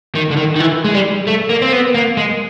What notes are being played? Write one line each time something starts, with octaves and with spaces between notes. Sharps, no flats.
D#3
D3
D#3
D#3
E3
G#3
G3
A3
A#3
C4
B3
A#3
G#3